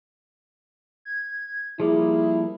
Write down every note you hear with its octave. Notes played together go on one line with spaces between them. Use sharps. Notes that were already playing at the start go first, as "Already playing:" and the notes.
G#6
F3 G3 A#3 E4 G#4